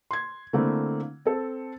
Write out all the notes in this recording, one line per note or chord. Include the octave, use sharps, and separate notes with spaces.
C6 G#6
D3 A3 A#3 C4 E4
C4 A4